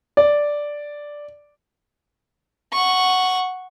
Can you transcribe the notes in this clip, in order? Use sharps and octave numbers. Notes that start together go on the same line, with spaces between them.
D5
F#5 C#6